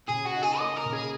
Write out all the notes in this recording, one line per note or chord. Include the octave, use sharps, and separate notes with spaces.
C#3 G#4
F#4
D#4
G#4
A#3 D#5
A#4
C#3
G#4